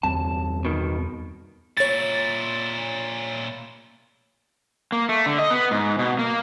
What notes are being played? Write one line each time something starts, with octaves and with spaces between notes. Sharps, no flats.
E2 G3 C4 A5
B2 D#3
A#2 E4 C#5 A6
A#3
A3
D3
D#5
B3
G#2
B2
A#3